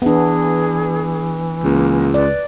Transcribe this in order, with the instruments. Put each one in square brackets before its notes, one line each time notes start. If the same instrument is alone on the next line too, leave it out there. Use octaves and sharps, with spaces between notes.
[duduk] E3 [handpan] B3 D4 [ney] G#4
[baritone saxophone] C#2 [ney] A#3
[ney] B4 [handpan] D5